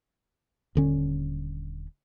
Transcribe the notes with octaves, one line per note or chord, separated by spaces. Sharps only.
D#1 D3 C#4